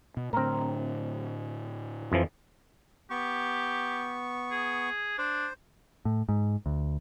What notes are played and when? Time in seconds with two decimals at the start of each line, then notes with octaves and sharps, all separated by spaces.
0.17 B2
0.33 A2 D3 C4 A#4
2.12 F2 E3 F3
3.10 B3 G4 C#6
4.52 G#4
5.18 D4 C5
6.05 A2
6.29 G#2
6.66 D2